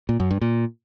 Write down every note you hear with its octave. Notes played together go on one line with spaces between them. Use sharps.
A#2
F#2
G2
A#2